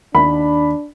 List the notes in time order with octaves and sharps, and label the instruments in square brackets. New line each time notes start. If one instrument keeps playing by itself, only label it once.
[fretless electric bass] D#2 [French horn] D4 [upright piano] B5